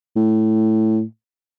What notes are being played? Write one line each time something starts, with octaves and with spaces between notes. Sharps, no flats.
A2